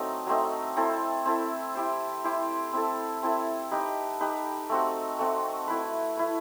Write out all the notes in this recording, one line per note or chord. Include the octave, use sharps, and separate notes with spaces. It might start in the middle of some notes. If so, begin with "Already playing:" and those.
Already playing: F#3 A3 C4 D#4
F#3 A3 C4 D#4
C4 E4 A4
C4 E4 A4
E4 G4 C5
E4 G4 C5
C4 E4 A4
C4 E4 A4
D#4 G4 B4
D#4 G4 B4
A3 C4 F#4
A3 C4 F#4
A3 E4 B4
A3 E4 B4